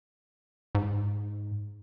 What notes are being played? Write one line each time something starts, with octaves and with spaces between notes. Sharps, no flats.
G#2